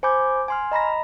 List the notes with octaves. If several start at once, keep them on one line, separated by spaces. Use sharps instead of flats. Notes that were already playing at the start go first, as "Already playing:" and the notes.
C5 G#5 B5 D6 G6
G#5 C6 F6
D#5 A#5 B5 A#6